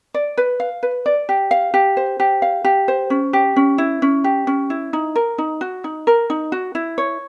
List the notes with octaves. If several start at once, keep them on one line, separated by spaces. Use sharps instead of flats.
D5
B4
F5
B4
D5
G4
F5
G4
C5
G4
F5
G4
C5
C#4
G4
C#4
E4
C#4
G4
C#4
E4
D#4
A#4
D#4
F#4
D#4
A#4
D#4
F#4
E4
C#5